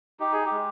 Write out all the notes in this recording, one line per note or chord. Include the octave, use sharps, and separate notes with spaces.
D#4 G4
G#4
G4
G#3